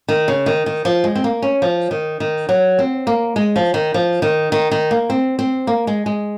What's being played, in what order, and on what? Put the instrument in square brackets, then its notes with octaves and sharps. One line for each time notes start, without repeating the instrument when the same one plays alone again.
[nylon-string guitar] D#3
C#3
D#3
D#3
F3
G#3
C4
A#3
C#4
F3
D#3
D#3
F#3
C4
A#3
G#3
F3
D#3
F3
D#3
D#3
D#3
A#3
C4
C4
A#3
G#3
G#3